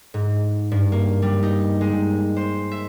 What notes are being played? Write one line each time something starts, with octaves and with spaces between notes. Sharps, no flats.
G#2
G2
A#3
G3
D#4
G#3
C5
E5